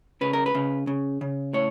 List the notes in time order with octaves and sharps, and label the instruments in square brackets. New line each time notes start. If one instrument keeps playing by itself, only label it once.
[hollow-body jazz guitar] C#3 B4
A#4
B4
C#3
C#3
C#3
A2 C#5